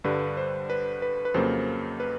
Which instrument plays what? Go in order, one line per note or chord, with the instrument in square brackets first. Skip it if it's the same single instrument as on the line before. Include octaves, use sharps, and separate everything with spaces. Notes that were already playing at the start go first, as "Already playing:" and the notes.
[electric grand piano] G2 D3 G3 B4
C5
B4
B4
B4
F2 C#3 F#3 A#3 C5
B4